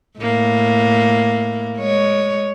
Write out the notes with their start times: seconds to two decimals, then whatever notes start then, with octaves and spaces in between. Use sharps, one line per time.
0.18 A2 A#3
1.78 G#3 C#5